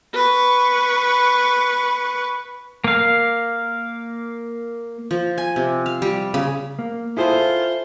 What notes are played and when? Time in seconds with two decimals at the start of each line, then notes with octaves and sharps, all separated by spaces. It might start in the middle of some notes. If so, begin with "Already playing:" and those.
0.14 B4 C#6
2.84 A#3 F5
5.11 F3
5.38 G#5
5.56 C3
5.86 F5
6.02 G3
6.34 C#3
6.79 A#3
7.17 E4 F4 G#4 A4 C5